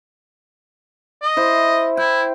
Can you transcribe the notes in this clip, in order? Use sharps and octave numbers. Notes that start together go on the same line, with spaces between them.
D#5
E4 C5
E4 G5